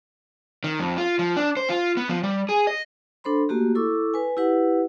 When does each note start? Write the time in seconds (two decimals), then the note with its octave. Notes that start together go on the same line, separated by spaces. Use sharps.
0.64 D#3
0.80 F2
0.98 F4
1.19 F3
1.37 D4
1.57 C5
1.70 F4
1.97 B3
2.09 F3
2.23 G3
2.49 G#4
2.67 D#5
3.24 D4 A4 C5 B5 C6
3.49 A3 A#3 F#4 G4
3.75 E4 A4 C#6 D6 E6
4.14 B4 G#5
4.37 E4 G4 B4 F#5